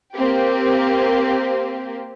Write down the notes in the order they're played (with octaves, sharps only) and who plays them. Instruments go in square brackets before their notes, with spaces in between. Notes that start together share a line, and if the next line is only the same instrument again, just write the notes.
[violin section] A#3 C4 G4